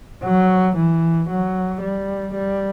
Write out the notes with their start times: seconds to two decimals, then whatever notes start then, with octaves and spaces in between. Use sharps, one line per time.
0.23 F#3
0.76 E3
1.29 F#3
1.81 G3
2.33 G3